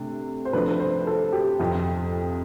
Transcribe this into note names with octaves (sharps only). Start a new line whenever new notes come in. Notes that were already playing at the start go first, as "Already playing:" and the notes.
Already playing: C3 A3 D4
C5
C3 F3 A3 D4 B4
B4
C5
A4
G4
F2 C3 F3 C4